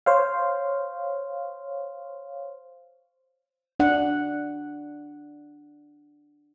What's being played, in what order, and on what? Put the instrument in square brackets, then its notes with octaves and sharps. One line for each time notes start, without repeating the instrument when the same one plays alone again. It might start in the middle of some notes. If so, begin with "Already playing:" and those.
[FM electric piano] C5 C#5 F5
[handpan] D4 F#5